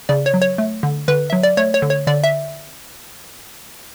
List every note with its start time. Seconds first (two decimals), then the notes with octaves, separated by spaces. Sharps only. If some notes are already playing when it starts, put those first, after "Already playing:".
0.09 C#3 D5
0.26 C#5
0.34 F#3
0.42 C#5
0.58 A3
0.83 D3
1.08 D3 B4
1.30 F#3 E5
1.43 D5
1.57 A3 C#5
1.74 C#5
1.82 D3
1.90 C#5
2.07 D3 D5
2.24 E5